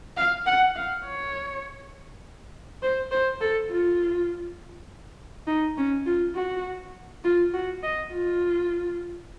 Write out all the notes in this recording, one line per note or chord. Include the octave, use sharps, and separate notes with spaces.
F5
F#5
F5
C#5
C5
C5
A4
F4
D#4
C#4
F4
F#4
F4
F#4
D#5
F4